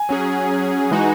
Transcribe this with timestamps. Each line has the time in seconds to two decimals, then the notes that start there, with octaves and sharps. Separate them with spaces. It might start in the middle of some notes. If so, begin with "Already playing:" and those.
Already playing: G#5
0.09 F#3 C#4 G#4
0.91 E3 G#3 D#4 F#4